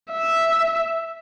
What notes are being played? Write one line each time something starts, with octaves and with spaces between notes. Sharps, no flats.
E5